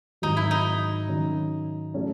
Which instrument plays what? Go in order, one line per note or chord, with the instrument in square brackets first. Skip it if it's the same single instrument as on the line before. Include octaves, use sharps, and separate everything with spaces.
[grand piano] G#2 D#3 F#3 [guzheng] D#4
[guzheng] E4
D#4
[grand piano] D#3 F#3 C#4
F#3 A3 C#4 F#4